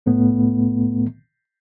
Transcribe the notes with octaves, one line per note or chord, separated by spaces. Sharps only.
C2 A2 A3 B3